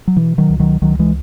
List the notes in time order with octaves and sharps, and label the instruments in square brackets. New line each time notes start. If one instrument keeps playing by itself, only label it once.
[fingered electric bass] F#3
B2 E3
D#3 F#3
C#2
D#3 F#3
C#2 D#3 F#3
E3 G#3